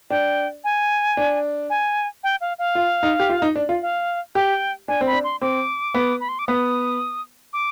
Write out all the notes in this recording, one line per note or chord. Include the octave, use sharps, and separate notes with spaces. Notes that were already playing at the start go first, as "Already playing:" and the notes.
D4 G5
G#5
D4
G#5
G5
F5
F5
F4
D#4
G4
F4
D#4
D4
F4
F5
G4 G5
D4 G#5
C4
B5
D4
C6
C4 D6
B3
B5
C6
D6
B3 D#6
D6